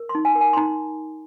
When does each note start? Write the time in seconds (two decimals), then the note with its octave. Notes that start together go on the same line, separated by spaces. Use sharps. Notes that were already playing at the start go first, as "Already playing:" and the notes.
Already playing: A#4
0.09 C6
0.15 D#4
0.25 G#5
0.36 A#4
0.41 G#5
0.53 C6
0.57 D#4 A#5